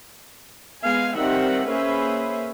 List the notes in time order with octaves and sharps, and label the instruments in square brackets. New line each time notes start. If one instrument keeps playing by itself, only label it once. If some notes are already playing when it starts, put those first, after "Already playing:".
[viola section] G#3 B3 F5 G#5
D#3 G3 C4 D#4 E5 F#5
A#3 C#4 G#4 B4 C5 E5